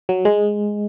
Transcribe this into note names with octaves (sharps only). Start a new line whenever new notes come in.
F#3
G#3